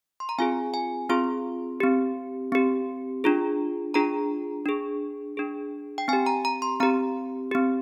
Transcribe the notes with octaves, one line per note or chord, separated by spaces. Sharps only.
C6
A#5
C4 F4 G#4 G#5
G#5
C4 F4 G#4 C6
C4 G4
C4 G4
D4 F4 G#4
D4 F4 G#4 A#5
D4 G#4
D4 G#4
G5
C4 G#5
G4
A#5
A#5
C6
C4 G4 A#5
C4 G4